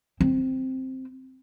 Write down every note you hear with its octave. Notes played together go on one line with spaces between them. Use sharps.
C4